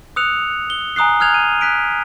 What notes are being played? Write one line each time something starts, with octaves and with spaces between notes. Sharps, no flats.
D#6 E6 F#6 C#7 F7
G7
G#5 A#5 D#6 F#6 C7
F6 F#6 G#6 F7
D#7
F#6 B6 D7